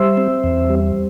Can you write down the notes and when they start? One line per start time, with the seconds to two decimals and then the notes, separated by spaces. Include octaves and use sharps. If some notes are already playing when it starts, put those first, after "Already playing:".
Already playing: G3 C5 E5
0.17 C4
0.44 E2
0.70 G3